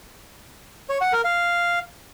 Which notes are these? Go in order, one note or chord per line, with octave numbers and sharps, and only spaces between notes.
C#5
F#5
A#4
F5